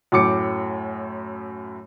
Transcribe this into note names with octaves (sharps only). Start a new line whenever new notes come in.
F#2 A2 D6 C#7